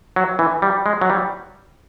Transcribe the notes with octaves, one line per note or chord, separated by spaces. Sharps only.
F#3
E3
G3
G#3
F#3
G3